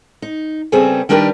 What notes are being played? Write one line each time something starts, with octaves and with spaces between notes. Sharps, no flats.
D#4
C#3 G3 B3 C4 G#4 A4
D#3 G3 D4 G4 A#4 B4